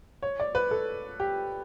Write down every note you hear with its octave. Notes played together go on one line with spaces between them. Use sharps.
C#5
D5
B4
A4
G4